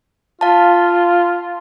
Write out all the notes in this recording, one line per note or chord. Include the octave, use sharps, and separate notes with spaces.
F4 F5 A5